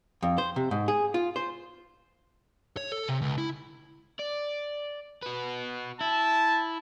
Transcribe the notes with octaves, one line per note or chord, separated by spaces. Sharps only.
F2
C5
C3
G#2
G#4
F4
C5
C#5
A4
C3
C#2
E4
D5
F#4 B4
E4 A5